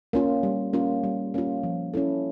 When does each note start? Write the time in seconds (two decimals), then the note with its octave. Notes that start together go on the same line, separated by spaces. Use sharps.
0.13 A#3 C#4 F4
0.43 G3
0.73 A#3 C#4 F4
1.04 G3
1.34 A#3 C#4 F4
1.63 F3
1.94 C#4 E4 A4